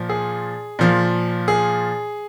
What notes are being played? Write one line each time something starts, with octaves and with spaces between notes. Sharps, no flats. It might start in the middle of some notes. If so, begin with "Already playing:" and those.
Already playing: A#2 F3
G#4
A#2 F3
G#4